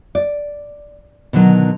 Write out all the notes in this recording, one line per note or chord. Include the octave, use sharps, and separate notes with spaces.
D5
B2 D3 D#3 F#3